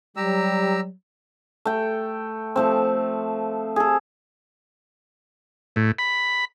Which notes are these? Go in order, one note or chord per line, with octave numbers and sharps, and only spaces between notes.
F#3 G3 G4 A#5 E6
A3 G5
F3 A3 C4
G#4 A4
A2
B5